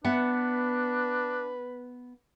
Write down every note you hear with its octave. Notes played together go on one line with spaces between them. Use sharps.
B3 D4 B4 E5 F#5